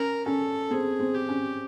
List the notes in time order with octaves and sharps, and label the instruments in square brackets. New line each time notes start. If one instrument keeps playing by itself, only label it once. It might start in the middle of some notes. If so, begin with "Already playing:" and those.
Already playing: [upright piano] C#4 [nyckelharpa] A#4
[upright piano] C#4 [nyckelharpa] A4
[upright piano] C4 [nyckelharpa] G#4
[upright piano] C4
[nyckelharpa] G4
[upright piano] C#4